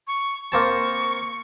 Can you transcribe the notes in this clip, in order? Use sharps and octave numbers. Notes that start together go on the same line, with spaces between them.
C#6
A#3 C4 A5 C#6